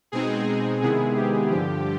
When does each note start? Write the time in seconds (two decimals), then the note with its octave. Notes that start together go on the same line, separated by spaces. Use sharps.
0.12 B2 G#3 C4 D#4 G#4
0.81 C3 D#3 G#3 B3 E4 G#4
1.16 G4
1.50 G2 D3 F3 G4